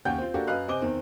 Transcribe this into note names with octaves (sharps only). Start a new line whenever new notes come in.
D#2 C#4 F#5 G5 G6
C4 F4
A#3 D4 F#4 G4 A4
F#2 B4 D#5 F5 F#6
C3 C4 D#5 G#5 D6 G7
E2 D#3 C4